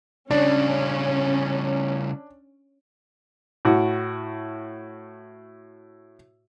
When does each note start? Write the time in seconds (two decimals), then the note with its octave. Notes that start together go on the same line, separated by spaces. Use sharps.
0.31 C#3 G3 C#4 D4
3.65 A2 F#4